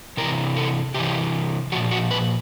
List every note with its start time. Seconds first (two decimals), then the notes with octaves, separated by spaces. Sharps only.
0.17 C3 E3 A#4
0.56 A4
0.94 C3 E3 G4
1.72 A#2 F3 F#4
1.91 F#4
2.11 B4